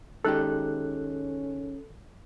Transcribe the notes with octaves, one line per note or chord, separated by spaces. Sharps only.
D#3 G#3 C#4 G4 A4 F#6